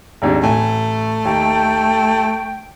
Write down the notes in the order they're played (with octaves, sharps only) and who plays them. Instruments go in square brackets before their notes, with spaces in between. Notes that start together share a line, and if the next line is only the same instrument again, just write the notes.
[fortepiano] G#1 D#2 D4
[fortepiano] A1 G#5 [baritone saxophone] A3
[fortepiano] D#2 [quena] G5